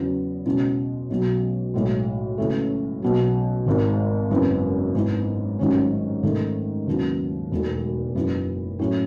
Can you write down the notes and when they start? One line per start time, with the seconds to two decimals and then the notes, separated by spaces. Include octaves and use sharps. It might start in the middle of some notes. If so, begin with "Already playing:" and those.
Already playing: E2 C#3 F#3 B3 E4
0.46 C#2 B2 G#3 C#4 E4
1.10 B1 B2 F#3 B3
1.74 B1 A2 G#3
2.38 C#2 C#3 E3 A3
3.02 B1 B2 F#3
3.66 G#1 G#2 D#3
4.31 G#1 F#2 C#3 E3 B3
4.95 G#2 E3 B3
5.59 A1 G#2 D#3 F#3 C#4
6.23 G#2 D#3 A3
6.87 D#2 C#3 F#3 B3 E4
7.51 E1 E2 B2 A3 D#4
8.15 F#1 F#2 E3 B3 D#4
8.79 A2 F#3 C#4 E4